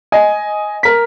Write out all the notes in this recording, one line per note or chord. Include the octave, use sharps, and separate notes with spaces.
D#5 G#5
A#4 B6